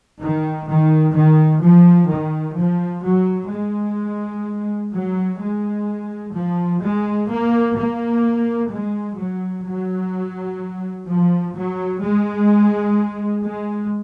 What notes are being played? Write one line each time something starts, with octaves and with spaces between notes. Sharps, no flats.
D#3
D#3
D#3
F3
D#3
F3
F#3
G#3
F#3
G#3
F3
G#3
A#3
A#3
G#3
F#3
F#3
F3
F#3
G#3
G#3